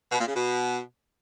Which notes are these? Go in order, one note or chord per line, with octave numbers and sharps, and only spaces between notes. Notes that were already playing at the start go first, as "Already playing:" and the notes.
B2
A#2
C#3
B2